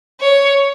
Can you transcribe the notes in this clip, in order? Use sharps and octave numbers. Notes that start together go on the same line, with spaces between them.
C#5